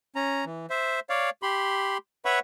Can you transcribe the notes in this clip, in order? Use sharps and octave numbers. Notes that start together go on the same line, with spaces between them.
C#4 A#5
E3
C5 E5
C#5 D5 F5
G4 B5 C6
B4 C#5 E5 F#5 B5 C#6